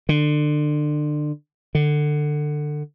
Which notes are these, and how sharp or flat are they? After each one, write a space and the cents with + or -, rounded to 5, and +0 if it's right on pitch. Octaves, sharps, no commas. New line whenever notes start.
D3 +30
D3 +20